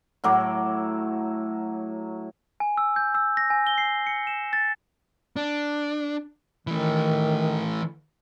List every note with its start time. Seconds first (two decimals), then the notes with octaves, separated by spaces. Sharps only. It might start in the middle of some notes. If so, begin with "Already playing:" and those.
0.24 A2 F#3 D6
2.60 G#5
2.78 E6
2.96 G6
3.15 E6
3.37 A#6
3.50 G#5
3.67 G7
3.78 C7
4.07 C#7
4.27 E7
4.53 A6
5.36 D4
6.67 D#3 E3 A3